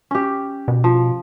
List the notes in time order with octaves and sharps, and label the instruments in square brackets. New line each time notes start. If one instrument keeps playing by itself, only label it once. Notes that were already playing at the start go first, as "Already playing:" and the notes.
[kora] C#4 G4
[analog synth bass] B2
[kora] F3